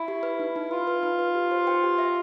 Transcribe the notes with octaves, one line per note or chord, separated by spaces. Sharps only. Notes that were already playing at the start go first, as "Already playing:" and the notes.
Already playing: E4
G4
B4
D#4
D#4
F4 B4
B4
D#4
B4
G4
C5
G5
G4
E5